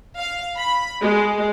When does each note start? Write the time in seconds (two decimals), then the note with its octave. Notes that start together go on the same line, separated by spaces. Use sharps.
0.18 F5
0.56 B5
1.01 G#3